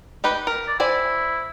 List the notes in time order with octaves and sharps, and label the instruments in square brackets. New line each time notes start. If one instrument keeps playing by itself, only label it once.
[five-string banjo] D#4 G4 B4
A#4
[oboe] D5
[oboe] E4 [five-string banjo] C5 D5 G#5